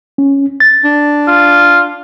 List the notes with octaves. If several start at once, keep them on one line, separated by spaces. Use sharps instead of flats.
C#4
A6
D4
F4